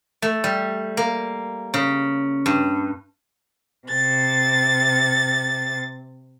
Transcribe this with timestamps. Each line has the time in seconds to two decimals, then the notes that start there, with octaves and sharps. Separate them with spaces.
0.22 A3
0.44 G3
0.97 A#3
1.74 C#3
2.46 G2
3.88 C3 A6